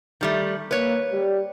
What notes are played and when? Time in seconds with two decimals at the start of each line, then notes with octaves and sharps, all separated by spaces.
0.21 D#3 G3 A3
0.71 A#3 B4 C#5
1.12 G3